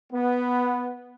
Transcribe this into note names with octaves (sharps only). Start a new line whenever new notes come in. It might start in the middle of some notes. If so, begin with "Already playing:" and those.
B3